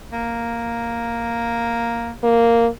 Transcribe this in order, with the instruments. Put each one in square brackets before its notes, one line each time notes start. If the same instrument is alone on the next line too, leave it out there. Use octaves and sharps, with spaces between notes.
[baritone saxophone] A#3
[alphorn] A#3